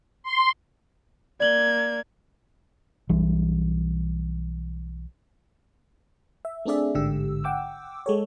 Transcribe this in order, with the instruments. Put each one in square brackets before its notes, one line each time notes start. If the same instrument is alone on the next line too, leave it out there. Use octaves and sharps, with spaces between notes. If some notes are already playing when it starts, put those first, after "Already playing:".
[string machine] C6
[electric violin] A#3 G#6 [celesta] D5 F#7 G7
[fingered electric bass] B1 E3 G3
[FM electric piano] E5
A3 C4 D4 G#4 D5 E5
A1 G#2 D3 G4 E6
F#5 G5 D6 E6
G#3 A4 C#5